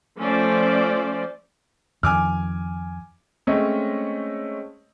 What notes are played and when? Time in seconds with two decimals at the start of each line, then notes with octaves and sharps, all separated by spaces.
0.18 F3 A3 C#4 C5 D5
2.03 F2 D#3 G#5 D6 F6
3.47 G#3 A3 C4 C#4 C#5 D#5